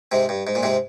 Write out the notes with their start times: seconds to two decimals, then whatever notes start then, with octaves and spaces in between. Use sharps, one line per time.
0.12 G#2 C3
0.29 G2
0.47 G#2
0.55 A#2
0.63 G#2 C3